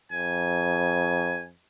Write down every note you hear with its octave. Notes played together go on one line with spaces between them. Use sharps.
F2 G#5